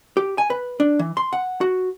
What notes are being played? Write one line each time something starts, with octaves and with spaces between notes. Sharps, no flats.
G4
G#5
B4
D4
E3
C6
F#5
F#4